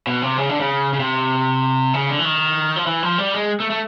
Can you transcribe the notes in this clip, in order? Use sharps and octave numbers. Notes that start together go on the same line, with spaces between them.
B2
C3
C#3
D3
C#3
C#3
C3
C#3
D3
E3
D#3
F3
E3
F3
G3
G#3
A3
A3